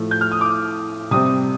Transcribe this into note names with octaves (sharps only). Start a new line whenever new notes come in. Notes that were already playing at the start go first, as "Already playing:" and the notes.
Already playing: A2 F3 A3
G6
F6
D#6
D6
C3 G3 C4 D#6